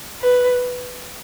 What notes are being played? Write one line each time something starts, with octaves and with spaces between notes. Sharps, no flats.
B4